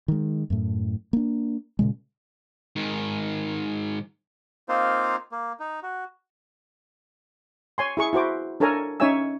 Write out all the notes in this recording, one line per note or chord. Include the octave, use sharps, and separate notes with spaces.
D#3 G#3
F#2 A2
A#3 D4
A#2 C#3 G#3
G#2 D#3
A#3 C4 D#4 F4 C5
A#3
D#4
F#4
C#5 G#5 C6
E4 G#4 C#6
E4 F#4 C5 D6
D4 A4 A#4 C#5 G#5 A#5
C#4 D#4 C#5 E5 G#5 E6